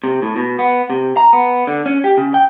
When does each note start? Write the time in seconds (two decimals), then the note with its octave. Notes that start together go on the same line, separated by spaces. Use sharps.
0.04 C3
0.22 A2
0.36 B2
0.59 B3
0.90 C3
1.17 A#5
1.33 B3
1.67 D3
1.86 C#4
2.04 G4
2.17 C#3
2.34 G5